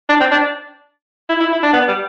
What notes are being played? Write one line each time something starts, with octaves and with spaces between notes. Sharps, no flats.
D4
C4
D4
E4
E4
E4
D4
B3
G3